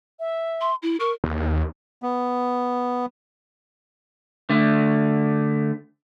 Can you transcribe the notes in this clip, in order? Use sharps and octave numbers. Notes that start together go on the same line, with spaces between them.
E5
C6
E4
A#4 C#6
D#2
B3
D3 A3